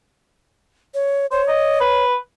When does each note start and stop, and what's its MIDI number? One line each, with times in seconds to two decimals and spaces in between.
0.94 1.26 73
1.31 1.42 72
1.31 2.04 73
1.48 1.79 75
1.81 2.17 71